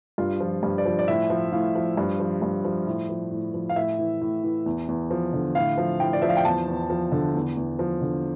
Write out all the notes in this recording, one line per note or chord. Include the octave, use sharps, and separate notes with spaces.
G2 F4
F3
G2
D5
F3
D5
A2 E5
F3
A2 F5
F3
G2
F3
G2
F3
A2
F3
A2
F3
F5
A2 E5
E3
A2
E3
E2
E2
F3
D3
A2 F5
F3
A2 G5
D5
F3 E5
F5
G5
E2 A5
E2
F3
D3
E2
E2
F3
D3